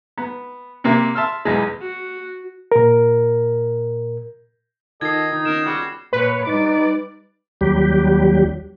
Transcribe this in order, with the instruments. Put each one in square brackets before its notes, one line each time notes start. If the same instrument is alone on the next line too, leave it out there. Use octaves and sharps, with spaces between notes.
[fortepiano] B3
C3 A#3 E5
E5 A5 C6 E6 F6
B1 E2 G#3
[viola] F#4
[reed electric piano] A#2 A#4
[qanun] D#3 F4 B4 [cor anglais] A4 [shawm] D#5 [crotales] G#6 C7
[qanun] D#3 [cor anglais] D#4
[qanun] D#3 B3 C#4 [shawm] A#4 [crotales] E7
[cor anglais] G3 [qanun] F4 G#4 D#5 [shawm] F#4
[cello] A#2 C#5 [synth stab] B4
[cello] G3 D5 [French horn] D#4
[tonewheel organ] D#2 F#3 G3 G4